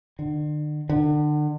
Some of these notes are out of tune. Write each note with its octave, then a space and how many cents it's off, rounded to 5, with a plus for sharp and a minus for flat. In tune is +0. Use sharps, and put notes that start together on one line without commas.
D3 +40
D3 +35